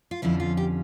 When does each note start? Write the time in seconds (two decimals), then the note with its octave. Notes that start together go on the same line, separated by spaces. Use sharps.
0.11 F4
0.22 F2 D3 F3 C#4 E4
0.40 F4
0.57 G4